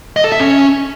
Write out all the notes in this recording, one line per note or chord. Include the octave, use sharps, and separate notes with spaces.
D#5
A4
E5
C#4